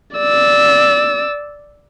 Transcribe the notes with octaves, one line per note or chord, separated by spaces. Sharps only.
D5 E6